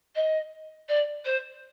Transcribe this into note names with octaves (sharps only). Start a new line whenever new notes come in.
D#5
D5
C5